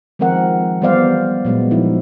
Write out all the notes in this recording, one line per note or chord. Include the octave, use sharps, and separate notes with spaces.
D#3 F3 G#3 C4 A#4 F#5
E3 G3 B3 C5 D5 F5
A#2 F#3 G#3 B3
F3 D#4 E4